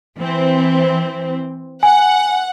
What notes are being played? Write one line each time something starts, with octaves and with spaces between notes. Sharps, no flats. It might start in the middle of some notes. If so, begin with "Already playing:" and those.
E3 C4
F#5 G#5